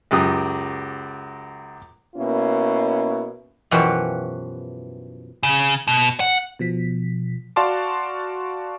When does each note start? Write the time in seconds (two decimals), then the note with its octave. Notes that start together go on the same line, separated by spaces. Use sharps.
0.11 C#2 F#2 G4 D#6
2.16 B2 A#3 C#4 E4
3.71 F#2 B2 E3 F3 F#4 G4
5.43 C#3
5.88 B2
6.20 F#5
6.59 B2 F3 B6
7.56 F#4 D5 F5 A5 C6 D6